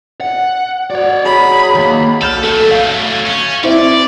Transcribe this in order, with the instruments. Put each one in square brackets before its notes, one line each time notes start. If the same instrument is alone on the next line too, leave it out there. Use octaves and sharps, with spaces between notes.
[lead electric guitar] F#5
[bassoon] F#4 [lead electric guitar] C#5 D5
[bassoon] F#3 [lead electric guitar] G#4 [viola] B5
[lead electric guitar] D#3 A#3
[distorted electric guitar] A4 [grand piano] F6 G6 F7
[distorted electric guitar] F#3 A3 [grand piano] A4
[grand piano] F5
[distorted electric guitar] C#4
[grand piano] C4 E4 [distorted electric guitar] D5